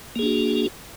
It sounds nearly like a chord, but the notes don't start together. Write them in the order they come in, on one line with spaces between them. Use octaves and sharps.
A#3 G#4 D4 F#4